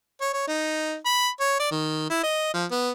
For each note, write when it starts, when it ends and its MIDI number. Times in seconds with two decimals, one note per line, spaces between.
0.21 0.30 73
0.33 0.43 73
0.48 0.95 63
1.05 1.28 83
1.40 1.55 73
1.59 1.69 74
1.71 2.06 51
2.10 2.18 64
2.23 2.52 75
2.54 2.65 53
2.71 2.91 59